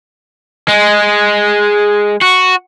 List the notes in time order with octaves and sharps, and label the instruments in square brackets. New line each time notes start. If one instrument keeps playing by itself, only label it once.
[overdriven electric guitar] G#3
F#4